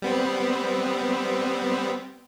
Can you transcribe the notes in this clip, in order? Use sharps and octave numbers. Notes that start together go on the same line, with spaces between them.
G3 B3 C4